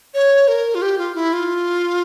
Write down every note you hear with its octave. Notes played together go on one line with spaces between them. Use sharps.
C#5
A#4
F4
G4
F4
E4
F4